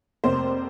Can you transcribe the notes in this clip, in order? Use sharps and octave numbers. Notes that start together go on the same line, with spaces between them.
F1 F2 C3 A#3 C5